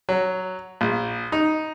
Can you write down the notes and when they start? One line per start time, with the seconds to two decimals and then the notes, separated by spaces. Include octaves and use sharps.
0.09 F#3
0.81 A#1
1.32 D#4